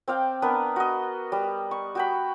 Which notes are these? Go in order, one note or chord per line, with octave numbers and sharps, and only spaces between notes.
C4 D5 F5 G5
B3 D4 A#4 B4
F#4 D#5
G3
C#6
F#4 G5 B5